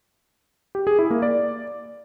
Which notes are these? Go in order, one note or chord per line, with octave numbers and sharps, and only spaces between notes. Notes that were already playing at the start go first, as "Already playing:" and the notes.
G4
G#4
E4
A#3
D5